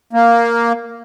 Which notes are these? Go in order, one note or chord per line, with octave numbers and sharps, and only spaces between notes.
A#3